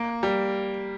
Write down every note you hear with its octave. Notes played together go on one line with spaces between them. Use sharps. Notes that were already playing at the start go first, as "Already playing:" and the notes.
Already playing: A#3
G3